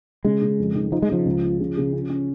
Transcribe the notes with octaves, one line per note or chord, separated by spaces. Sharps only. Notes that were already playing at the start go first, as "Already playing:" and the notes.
C#3 G#3
C#3
F2
D#3
F3 D#4
G#3
C#3 F3
C#2
F4
C#3
C#3
C#4
C#4